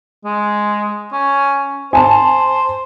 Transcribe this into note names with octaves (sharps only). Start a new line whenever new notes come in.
G#3
C#4
C5 G#5 A5